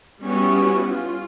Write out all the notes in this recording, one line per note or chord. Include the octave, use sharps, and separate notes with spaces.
G3 B3 C#4 E4 F#4
F4